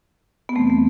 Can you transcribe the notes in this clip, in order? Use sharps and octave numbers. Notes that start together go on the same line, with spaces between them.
B3
E2 C3 E3 G3 A3 C4
A3